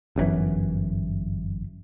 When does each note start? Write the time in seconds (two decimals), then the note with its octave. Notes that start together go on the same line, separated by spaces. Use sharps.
0.16 G1 F#2 C3 E3